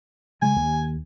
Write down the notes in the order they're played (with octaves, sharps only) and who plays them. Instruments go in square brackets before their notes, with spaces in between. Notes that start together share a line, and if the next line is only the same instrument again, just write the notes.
[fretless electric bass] C#3 G#3 [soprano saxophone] G#5
[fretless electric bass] D#2